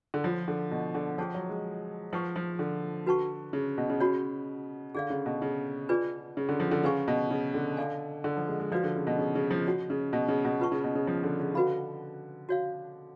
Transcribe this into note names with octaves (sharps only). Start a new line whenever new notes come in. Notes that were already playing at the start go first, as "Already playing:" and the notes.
D3
F3 F4 A4 C#5
D3
B2
D3
F3 C#4 G#4 C#5 F#5 A5
F#3
G#3
F3 B4 F#5 A5 C#6
F3
D3
F#4 B4 F#5 A5 C#6
C#3
B2
C#3
F#4 C#5 F#5 B5
D3 G#4 D5 F5
C#3
B2
C#3
D4 F4 G#4 B4 D5
C#3
D3
F3
D3
C#3 B4 F5 G#5 C#6
B2
C#3
D3
A4 D5 F5 G#5
D3
F3
G#3
G#3
F3 F#4 B4 D5 F5
D3
C#3
B2
C#3
C#3
F3
F#4 C#5 F#5
C#3
B2
C#3
B2
F4 B4 F#5 A5 C#6
C#3
B2
C#3
F3
D3
C#3
D3 F#4 B4 F5 B5
F#4 C#5 F5